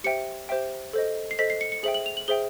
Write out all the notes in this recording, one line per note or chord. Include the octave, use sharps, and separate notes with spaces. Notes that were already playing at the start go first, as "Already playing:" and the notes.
G4 C5 E5 G5 C#7
G4 C5 E5 G5
A4 C5 D#5
C7
A4 C5 D#5 B6
C7
C#7
C#7
G#4 C5 E5 G5 F#7
F#7
F7
F#7
G#4 C5 E5 G5 G7